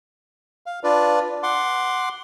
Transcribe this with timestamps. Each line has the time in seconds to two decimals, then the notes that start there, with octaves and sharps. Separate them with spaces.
0.66 F5
0.84 D4 F4 B4 D5
1.43 F#5 C6 D6